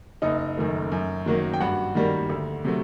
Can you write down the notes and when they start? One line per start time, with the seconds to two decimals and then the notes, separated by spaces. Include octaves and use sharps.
0.22 F#1 D#4 D#5
0.57 F#2 D#3 A3
0.92 F#2
1.26 D#3 F#3 A#3
1.53 G5
1.60 G2 F#4 F#5
1.95 D#3 G3 A#3
2.30 D2
2.65 C3 F#3 A3